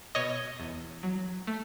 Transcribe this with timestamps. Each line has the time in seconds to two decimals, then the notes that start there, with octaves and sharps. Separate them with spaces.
0.15 B2 C#5 D#5
0.60 E2
1.03 F#3
1.47 A3